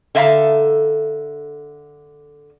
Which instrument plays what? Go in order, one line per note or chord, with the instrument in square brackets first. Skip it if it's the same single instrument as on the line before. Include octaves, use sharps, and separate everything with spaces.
[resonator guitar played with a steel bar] D3 A4 E5 F5 G#5 A#5